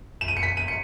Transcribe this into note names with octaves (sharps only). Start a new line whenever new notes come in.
E7
D#7
C#7
B6
D#7
C#7